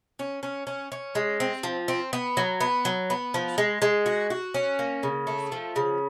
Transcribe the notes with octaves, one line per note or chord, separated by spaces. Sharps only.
C#4
C#4
C#4
C#4
G#3
C4
F3
C4
B3
F#3
B3
F#3
B3
F3
G#3
G#3
F#4
F#4
C#4
A#3
C#3
A3
F3
C#3